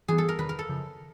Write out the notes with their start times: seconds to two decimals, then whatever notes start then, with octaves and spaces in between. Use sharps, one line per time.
0.08 E3 G3 B3 G#4
0.18 A4
0.29 A#4
0.39 E2 C3 D#3 B4
0.49 A#4
0.59 A4
0.69 F#2 C#3 F3